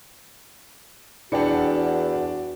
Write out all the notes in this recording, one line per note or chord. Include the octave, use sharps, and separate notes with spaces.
E2 D4 E4 F#4 D5 G5 A5 C#7